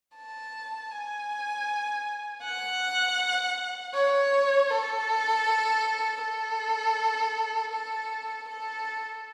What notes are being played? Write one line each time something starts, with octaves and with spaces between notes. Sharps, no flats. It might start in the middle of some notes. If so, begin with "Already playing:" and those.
A5
G#5
F#5
C#5
A4
A4
A4
A4